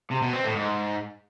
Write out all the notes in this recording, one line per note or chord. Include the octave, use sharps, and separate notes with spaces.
C3
B2
C4
A2
G#2